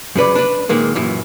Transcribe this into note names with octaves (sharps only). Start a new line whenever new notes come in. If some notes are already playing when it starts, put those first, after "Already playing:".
F#2 C#3 B4 D5
D4 B4
A#2 D#3 G#3 A#3
F#2 A#2 E3